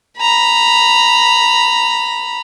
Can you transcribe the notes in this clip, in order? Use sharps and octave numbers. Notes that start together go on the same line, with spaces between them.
A#5 B5